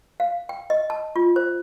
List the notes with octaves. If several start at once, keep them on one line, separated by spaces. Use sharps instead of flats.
F5
G5
D#5
A5
F4
C5